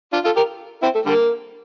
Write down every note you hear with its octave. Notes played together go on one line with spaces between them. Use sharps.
D4 F4
F4 A4
G4 A#4
C4 E4
A3
D3 G3 A#3